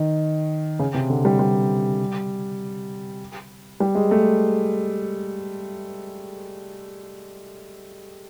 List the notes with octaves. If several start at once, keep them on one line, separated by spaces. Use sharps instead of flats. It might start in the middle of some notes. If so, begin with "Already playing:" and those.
Already playing: D#3
C#3
C3
D3
G3
G3
G3
G#3
A3